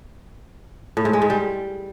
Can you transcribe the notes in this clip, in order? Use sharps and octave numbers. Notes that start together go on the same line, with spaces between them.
A2
G#2
G#3
G#2
G3